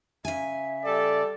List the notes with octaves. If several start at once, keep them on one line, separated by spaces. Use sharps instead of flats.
C#3 E5 G#5
G3 A4 D5